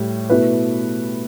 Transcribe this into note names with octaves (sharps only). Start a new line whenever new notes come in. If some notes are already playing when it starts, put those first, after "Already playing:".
Already playing: A2 G3
B2 A3 E4 B4